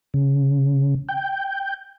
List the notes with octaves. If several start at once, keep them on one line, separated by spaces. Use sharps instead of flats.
C#3
G5